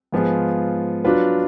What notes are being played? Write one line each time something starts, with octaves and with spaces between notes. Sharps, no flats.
G#2 F3 B3 F4 G#4
F#3 D4 F4 B4